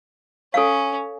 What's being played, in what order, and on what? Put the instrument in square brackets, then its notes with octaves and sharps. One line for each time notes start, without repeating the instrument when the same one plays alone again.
[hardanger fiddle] C#4 [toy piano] A4 C#5 F5